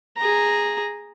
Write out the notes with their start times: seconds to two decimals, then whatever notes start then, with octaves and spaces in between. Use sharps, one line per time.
0.17 G#4 A#5